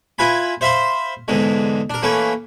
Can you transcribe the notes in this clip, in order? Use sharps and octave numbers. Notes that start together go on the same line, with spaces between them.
E4 F4 B4 G#5 B5
C5 E5 F5 B5 C6
E2 G#2 D3 G#3
D4 A#4
E3 A3 A#3 C#4 B4